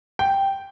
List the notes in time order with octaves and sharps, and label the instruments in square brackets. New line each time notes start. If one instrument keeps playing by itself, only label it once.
[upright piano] G5